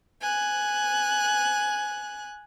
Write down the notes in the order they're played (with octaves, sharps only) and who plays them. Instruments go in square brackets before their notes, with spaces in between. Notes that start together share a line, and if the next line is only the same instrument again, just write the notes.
[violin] G#5 F#6